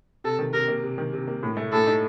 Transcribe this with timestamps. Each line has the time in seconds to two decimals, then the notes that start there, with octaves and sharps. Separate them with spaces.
0.24 C3 A4
0.39 D#3
0.54 C3 A#4
0.68 A#3
0.83 C3
0.98 D#3
1.13 C3
1.27 A#3
1.43 A2
1.57 A3
1.72 A2 A4
1.87 D#4